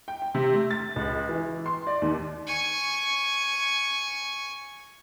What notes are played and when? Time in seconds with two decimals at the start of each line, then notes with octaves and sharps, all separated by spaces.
0.08 G5
0.22 G5
0.35 C3
0.54 A3
0.71 A6
0.96 C#2
1.29 E3
1.66 C6
1.87 D5
2.02 D#2
2.47 G#5 C#6